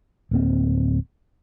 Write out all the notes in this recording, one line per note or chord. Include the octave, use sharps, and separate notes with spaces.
D1 A#3 C4